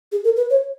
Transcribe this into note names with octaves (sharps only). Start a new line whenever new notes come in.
G#4
A#4
B4
C#5